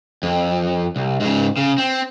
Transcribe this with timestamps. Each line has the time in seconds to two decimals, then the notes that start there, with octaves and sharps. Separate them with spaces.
0.23 F2
0.96 C2
1.20 G#2 C#3
1.57 C#3
1.78 C4